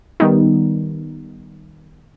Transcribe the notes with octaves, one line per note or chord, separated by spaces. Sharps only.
D#3 G3 B3 D#4